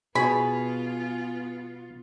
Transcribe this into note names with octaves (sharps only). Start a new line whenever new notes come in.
B2 B3 F4 G#4 B5